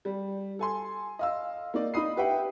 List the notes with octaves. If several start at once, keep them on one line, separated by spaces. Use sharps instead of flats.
G3
A4 G#5 C6
D#5 F5 E6
A#3 D#4 D5
D#4 B5 D#6 C7
G4 B4 E5 F#5 G5